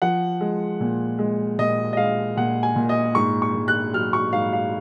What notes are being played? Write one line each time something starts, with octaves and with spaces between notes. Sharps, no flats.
F3 F#5
G#3
A#2
G#3
A#2 D#5
D#5
G#3 F5
A#2 F#5
G#5
A#2
D#5
G#2 C#6
C#6
G#2
F#6
F#3 F6
C#6
G#2 F5
F5